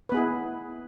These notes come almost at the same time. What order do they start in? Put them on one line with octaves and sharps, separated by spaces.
B4 B3 G#4 E4